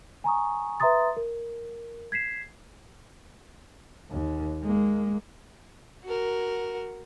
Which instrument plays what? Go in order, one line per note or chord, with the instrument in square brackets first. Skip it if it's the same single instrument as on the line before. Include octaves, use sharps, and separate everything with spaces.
[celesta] G#5 A#5 C#6 D#6
B4 E5 A#5 C6 D#6 A6
A#4
G#6 B6 C7 E7
[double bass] D#2
G#3 A#3
[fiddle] F#4 A#4